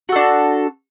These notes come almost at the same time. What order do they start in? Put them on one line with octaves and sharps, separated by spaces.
F#4 A4 D4